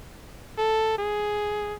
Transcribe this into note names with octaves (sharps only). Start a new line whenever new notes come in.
A4
G#4